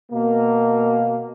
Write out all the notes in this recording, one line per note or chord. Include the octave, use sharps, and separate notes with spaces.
B2 A#3